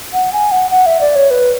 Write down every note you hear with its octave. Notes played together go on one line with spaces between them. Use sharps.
F#5
G#5
F#5
F#5
E5
D5
C#5
B4